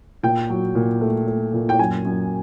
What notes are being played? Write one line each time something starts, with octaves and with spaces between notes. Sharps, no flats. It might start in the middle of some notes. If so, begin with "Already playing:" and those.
A#2 G5
F#3
A#2
A3
A3
A#2
G5
F#2 G#5
F#2